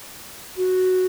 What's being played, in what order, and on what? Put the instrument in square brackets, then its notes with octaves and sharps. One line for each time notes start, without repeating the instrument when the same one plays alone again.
[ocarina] F#4